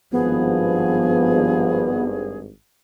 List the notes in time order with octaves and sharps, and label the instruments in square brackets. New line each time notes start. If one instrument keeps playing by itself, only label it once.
[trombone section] G#1 G2 [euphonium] F3 [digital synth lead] B3 [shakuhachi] G#4